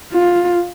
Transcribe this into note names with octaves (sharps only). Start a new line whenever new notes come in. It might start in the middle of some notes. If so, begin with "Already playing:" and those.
F4